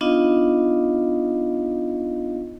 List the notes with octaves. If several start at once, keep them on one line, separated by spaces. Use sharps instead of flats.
B3 D4 D#4 F4 D#5 F5